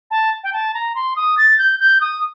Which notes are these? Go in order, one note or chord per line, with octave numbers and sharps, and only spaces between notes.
A5
G5
A5
A#5
C6
D#6
A6
G6
G6
D#6